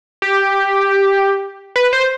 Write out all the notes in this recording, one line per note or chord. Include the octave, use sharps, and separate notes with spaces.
G4
B4
C5